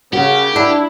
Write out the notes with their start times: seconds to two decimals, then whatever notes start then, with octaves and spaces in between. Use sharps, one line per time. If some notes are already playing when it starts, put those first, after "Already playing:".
0.13 C#3 F#4 G4 A#4
0.56 D4 E4